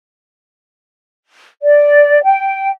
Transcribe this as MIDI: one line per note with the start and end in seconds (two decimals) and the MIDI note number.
1.63 2.19 74
2.25 2.69 79